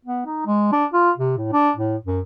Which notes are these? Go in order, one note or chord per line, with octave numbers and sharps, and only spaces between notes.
B3
D#4
G#3
D4
F4
C3
A2
D4
A2
F#2